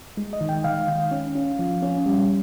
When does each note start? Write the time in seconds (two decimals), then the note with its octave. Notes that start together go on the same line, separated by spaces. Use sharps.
0.17 G#3
0.33 D#5
0.41 D#3
0.49 G5
0.64 D#3 F5
0.88 D#3
1.11 C#4
1.35 C#4
1.59 F3
1.82 C#4
2.06 G3